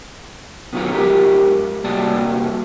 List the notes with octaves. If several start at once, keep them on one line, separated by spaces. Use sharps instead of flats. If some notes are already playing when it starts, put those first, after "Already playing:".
B2 D#3 F#3 F4 A#5
G#2 G4 A#4
C3 G3 A#3 F#4 D5 A5